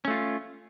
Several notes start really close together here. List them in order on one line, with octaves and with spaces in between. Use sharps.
C#4 A3 F4